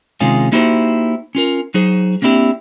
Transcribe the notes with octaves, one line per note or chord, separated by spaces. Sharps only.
C3 D#3 G#3 C#4 F4 G#4
A#3 D#4 E4 F#4 G4 C5
C#4 F4 A#4
F#3 D#4 G#4 C5
A#3 C4 D4 E4 G4